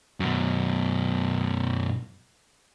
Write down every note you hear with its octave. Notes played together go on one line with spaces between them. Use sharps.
F#2 B2